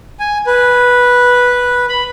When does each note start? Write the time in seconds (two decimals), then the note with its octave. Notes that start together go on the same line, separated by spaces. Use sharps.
0.20 G#5
0.47 B4
1.89 B5